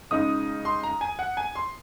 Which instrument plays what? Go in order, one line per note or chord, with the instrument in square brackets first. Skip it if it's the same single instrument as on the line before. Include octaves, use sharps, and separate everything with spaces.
[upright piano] C#3 G#3 D#4 D#6
C6
A#5
G#5
F#5
G#5
C6